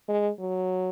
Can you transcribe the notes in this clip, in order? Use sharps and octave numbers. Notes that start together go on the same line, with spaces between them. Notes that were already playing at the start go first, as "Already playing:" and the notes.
G#3
F#3